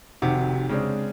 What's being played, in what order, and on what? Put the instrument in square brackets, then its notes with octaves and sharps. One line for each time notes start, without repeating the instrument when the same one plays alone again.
[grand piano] F1 C3 D#3 F#4
C#3 G#3 C4 D4